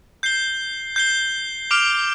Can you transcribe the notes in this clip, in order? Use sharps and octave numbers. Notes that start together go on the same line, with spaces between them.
G6 C7 G7
G6 C7 G7
D6 F6 D7 F7